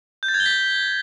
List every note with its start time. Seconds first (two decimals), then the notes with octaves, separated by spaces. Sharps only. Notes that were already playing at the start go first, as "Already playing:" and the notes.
0.23 G6
0.28 A6
0.34 G#6
0.40 G7
0.46 B6